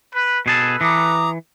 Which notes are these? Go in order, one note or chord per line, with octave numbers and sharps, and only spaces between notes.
B4
B2 G#4 A4 B4 A5
E3 A#5 D6 D#6